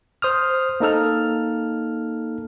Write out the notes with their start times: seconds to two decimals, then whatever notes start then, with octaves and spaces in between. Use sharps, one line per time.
0.22 C5 D#6 F6
0.80 A#3 D#4 A4 F6